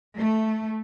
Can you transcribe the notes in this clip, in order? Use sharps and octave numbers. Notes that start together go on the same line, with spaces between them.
A3